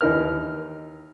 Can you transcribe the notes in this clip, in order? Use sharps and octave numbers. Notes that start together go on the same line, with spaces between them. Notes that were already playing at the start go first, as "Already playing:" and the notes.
D#2 E3 D#4 A#4 F6